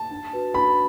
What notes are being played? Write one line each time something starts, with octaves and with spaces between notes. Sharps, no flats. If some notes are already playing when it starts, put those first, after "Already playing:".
Already playing: A5
D4
F#4 B4
D4 B5